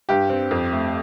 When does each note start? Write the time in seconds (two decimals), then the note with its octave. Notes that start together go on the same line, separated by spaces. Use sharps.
0.09 G2 G4
0.29 C4
0.51 F2
0.72 A3